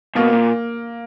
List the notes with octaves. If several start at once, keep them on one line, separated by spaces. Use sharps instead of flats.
B2 A#3
A#2